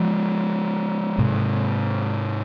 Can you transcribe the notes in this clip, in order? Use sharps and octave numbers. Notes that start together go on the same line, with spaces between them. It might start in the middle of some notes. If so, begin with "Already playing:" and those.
Already playing: F3 G#3
G#2 C3